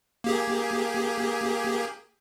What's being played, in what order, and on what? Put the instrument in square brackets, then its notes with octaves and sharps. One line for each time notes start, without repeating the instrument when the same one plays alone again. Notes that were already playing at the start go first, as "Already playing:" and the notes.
[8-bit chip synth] A#3 G4 G#4